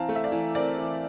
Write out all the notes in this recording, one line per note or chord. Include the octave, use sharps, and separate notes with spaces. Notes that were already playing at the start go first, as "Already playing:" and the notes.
Already playing: E3 C4 F5 A5 A#5
A3
E5
D5 F5
E3
C4 A#4 D5
E3